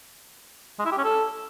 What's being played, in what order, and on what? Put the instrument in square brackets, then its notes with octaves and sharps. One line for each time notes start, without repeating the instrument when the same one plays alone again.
[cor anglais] G#3
E4
G4
C#4
A4